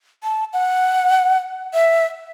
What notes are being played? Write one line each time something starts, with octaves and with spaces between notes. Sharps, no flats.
A5
F#5
E5